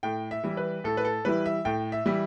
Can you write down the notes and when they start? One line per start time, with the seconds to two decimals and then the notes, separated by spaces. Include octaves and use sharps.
0.03 A2 G5
0.31 E5
0.44 E3 G3 E4
0.57 B4
0.84 A2 A4
0.97 B4
1.05 A4
1.25 E3 G3 E4 B4
1.46 E5
1.65 A2 G5
1.92 E5
2.06 E3 G3 E4